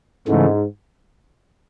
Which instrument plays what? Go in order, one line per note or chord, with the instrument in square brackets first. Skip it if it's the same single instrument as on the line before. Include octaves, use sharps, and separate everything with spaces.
[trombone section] G#2 [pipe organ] C#3 E3 A3